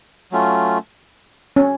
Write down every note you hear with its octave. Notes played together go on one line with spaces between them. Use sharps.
F#3 A3 C#4 F4
C#4